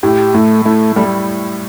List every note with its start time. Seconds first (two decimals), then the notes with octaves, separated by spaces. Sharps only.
0.03 A2 G4
0.34 A2 A3
0.65 A3 E4
0.96 G3 A3